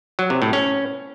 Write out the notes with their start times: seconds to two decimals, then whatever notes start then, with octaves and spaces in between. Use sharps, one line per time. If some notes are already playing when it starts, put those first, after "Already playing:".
0.19 F#3
0.30 C3
0.42 A2
0.53 C#4